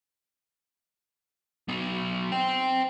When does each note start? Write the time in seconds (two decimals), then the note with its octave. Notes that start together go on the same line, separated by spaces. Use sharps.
1.68 F#3 B3
2.32 C5 G5